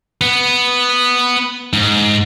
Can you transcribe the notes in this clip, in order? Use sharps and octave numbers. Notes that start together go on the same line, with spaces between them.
B3
G#2